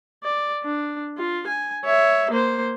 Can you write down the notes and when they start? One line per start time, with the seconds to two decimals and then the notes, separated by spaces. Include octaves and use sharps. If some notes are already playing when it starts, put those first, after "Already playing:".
0.24 D5
0.64 D4
1.18 F4
1.48 G#5
1.85 C#5 E5
2.32 A#3 C5